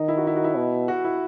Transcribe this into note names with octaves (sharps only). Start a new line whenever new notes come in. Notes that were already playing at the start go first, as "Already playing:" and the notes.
Already playing: D#3 D#4
E4
F#4
E4
F#4
E4
B2
F#4
E4